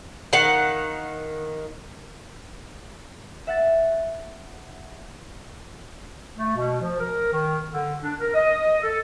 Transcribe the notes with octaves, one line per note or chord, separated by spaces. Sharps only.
D#3 F5 F#5
E5 F#5 A6
A3
B2
F3
A#4
D#3
D3
D4
A#4
D#5
A4